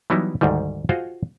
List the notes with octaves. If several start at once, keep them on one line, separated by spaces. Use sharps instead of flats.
E3 F#3 G3 B3 D#4 E4
D2 G#2 D#3 G3
F4 F#4 G#4 C5 D#5 F5